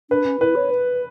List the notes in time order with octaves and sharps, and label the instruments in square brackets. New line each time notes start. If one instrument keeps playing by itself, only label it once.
[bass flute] D4 [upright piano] B4
[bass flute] C#4
[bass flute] E4 [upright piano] B4
[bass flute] C#5
B4